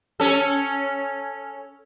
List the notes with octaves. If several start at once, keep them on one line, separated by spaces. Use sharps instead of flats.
C#4 A4